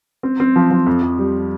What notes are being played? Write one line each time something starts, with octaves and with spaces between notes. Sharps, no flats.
C4
C4
F3
F3
F2
F2
G3